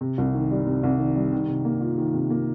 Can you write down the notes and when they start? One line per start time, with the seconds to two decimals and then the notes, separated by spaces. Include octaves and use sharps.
0.01 C3
0.18 C2
0.34 D#3
0.51 G3
0.67 C3
0.83 C2
0.99 D#3
1.16 G3
1.32 D#3
1.49 C3
1.65 A#3
1.81 F4
1.98 D#3
2.14 C3
2.30 A#3